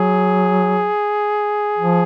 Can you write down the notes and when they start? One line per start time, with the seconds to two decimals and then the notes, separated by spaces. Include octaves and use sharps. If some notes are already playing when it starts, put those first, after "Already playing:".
Already playing: F#3 G#4
1.78 F3